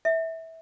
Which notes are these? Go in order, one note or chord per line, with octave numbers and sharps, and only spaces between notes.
E5